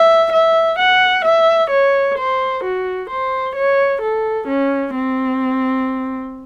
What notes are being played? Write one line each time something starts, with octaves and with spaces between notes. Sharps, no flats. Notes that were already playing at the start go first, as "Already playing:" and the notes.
Already playing: E5
E5
F#5
E5
C#5
C5
F#4
C5
C#5
A4
C#4
C4